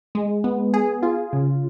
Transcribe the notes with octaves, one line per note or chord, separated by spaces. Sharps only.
G#3
B3
G#4
F4
C#3